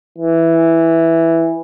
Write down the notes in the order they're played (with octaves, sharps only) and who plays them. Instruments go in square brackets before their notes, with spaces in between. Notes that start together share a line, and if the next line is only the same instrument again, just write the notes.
[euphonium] E3